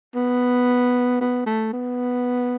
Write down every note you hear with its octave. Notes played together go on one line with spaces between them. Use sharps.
B3
B3
A3
B3